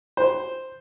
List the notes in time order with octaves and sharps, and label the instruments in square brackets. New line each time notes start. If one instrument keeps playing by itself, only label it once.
[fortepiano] C5